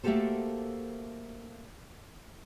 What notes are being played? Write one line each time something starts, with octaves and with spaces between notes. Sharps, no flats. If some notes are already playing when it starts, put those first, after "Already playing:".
A3 A#3 F#4 G4 A4 C5